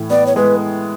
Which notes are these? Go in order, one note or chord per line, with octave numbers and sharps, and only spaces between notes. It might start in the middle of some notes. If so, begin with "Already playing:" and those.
Already playing: A2 E3
B3 D5
C#5
G#3 B4